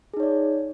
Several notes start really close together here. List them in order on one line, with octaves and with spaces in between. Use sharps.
G#4 D#4 C#5 D5